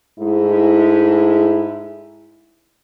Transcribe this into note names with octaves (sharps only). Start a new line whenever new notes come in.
G#2 G#3 A3 E4